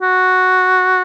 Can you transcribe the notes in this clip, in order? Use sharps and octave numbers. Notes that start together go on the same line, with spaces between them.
F#4